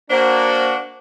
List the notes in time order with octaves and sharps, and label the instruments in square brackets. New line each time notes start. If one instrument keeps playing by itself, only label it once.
[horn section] A#3 D4 F#4 [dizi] C5